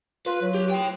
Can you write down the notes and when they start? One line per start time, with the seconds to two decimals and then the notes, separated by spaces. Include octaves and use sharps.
0.26 F4 B4
0.42 F#3
0.54 G4
0.70 C#5 G5